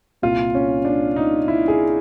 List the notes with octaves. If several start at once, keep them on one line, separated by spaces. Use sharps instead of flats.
C2 A#2 F4
C#4
D4
D#4
E4
G#4